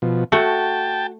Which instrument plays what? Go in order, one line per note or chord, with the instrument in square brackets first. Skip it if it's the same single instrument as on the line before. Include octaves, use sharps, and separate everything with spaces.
[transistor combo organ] B2 F3
[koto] A3 [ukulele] F#4 [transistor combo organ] G5 A5